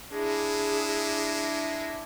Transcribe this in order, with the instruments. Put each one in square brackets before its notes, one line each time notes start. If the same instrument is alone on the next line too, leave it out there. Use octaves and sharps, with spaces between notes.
[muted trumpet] G#3 [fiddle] D4 E4 [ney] G#4